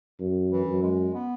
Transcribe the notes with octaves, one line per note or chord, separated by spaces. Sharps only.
F#2
E3
F#2
G#3
B3